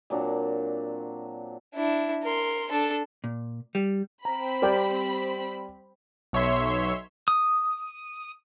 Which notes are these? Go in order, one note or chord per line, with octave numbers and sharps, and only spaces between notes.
A#2 F#3 C4 D4
D4 E4
A#4 C6
D4 A4
A#2
G3
C4 A#5 B5
G3 G4 A#4 D5 G5
B1 C#5 E5 C6
D#6